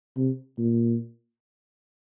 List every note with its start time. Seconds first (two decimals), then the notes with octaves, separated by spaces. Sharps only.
0.17 C3
0.59 A#2